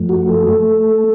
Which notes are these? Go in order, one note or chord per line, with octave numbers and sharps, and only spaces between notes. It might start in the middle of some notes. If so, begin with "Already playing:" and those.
Already playing: F#2 F3 A3
F#4
A4
A3